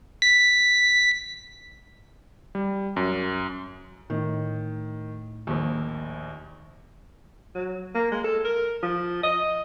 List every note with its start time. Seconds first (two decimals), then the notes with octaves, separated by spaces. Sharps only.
0.22 B6
2.55 G3
2.96 F#2
4.10 A2 D#3
5.47 A#1 D#2
7.55 F#3
7.95 A#3
8.12 G#3
8.24 A4
8.45 A#4
8.82 F3
9.23 D#5